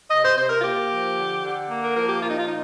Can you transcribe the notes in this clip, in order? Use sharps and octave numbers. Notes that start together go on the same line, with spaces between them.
C3 D#5
C5
C3 C5
A#4
F4
A#3 G4
F3
D3
D3
A#3
A#4
F3 A#4
G4
A#2 F4
D#4
F4
A#2 D#4